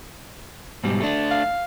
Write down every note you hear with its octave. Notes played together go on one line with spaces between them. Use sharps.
G#2 B2 G3
A3 D4
F5